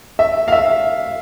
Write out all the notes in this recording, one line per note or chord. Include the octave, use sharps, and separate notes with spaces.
E5
F5
E5